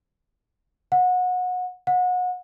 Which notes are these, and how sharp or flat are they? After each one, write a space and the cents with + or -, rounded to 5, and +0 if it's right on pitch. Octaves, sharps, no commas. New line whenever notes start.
F#5 -25
F#5 -30